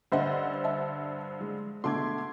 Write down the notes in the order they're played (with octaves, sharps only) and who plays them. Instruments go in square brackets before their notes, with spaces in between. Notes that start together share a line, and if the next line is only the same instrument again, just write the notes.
[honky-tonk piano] G2 D3 C5 [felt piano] D#5 E5 F#5
[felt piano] E5 A5
G#3
[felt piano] B2 D3 A3 [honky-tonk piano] C6 D6 G#6